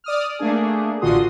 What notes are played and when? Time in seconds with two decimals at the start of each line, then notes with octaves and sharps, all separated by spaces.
0.04 D5 D#6 F6
0.39 A3 A#3 D4 G#4
1.01 A1 D3 F4 F#4 C6 D#6